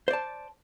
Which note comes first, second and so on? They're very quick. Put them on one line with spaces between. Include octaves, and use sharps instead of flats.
C5 D5 A5